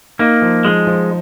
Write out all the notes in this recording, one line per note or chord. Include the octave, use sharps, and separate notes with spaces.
A#3 D#4
F3
F3 G#3
F3